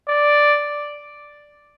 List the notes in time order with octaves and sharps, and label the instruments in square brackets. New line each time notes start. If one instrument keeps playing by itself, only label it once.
[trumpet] D5